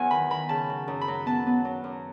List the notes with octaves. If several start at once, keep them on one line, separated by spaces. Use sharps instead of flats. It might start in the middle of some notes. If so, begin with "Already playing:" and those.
Already playing: E2 F#3 F#5 G#5
D#3 B5
D#3 B5
C#3 A5
F#3
F#2
B5
F#3
B3 A5
B3
F#3
F#2